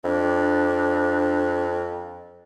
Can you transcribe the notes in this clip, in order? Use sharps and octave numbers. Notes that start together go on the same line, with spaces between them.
F2 D4